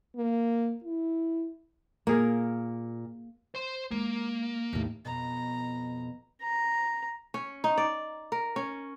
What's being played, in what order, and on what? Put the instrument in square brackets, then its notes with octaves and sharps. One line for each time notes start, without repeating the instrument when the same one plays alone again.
[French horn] A#3
E4
[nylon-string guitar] A#2 [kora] A#3 G#4 A#4
[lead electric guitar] C5 C6
[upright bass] G#3 [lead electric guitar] A#3
[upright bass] D#2 A2
[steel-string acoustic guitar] F2 B2 [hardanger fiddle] A#5
[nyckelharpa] A#5
[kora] C#4
D#4
D5
A#4
C#4